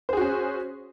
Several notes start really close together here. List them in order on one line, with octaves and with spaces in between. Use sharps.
C5 G#4 F#4 C#4